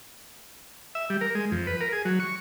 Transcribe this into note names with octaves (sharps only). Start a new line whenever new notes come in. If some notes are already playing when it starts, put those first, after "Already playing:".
E5
G3
A#4
G#3
F2
B4
A#4
G#4
F#3
C#6